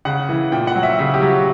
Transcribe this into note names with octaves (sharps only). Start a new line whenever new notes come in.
C#3 F#5
E3
A#2 G5
F#5
F#3
E5
C#3 E5
G4
F#3
F#4